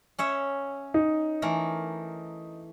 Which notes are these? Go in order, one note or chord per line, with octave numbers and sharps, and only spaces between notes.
C#4 C#5 E5
D#4
E3 A3 A#4